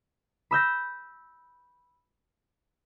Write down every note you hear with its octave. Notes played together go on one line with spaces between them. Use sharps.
B5 E6 G6 A#6